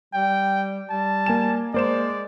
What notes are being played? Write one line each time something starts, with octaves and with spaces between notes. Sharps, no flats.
G3 G5
G3 A5
A#3 G#5 E7
G#3 A#3 C5 D5 E7